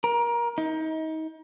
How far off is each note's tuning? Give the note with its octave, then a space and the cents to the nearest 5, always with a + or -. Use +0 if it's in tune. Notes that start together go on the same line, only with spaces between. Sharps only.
A#4 +25
D#4 +30